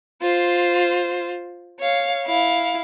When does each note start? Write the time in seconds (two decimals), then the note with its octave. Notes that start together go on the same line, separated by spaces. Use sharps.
0.22 F4 C5
1.80 C#5 F5
2.26 E4 F5